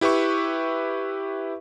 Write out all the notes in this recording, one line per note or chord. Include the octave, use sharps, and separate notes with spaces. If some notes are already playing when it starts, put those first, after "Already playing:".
E4 G4 B4 E5 C#6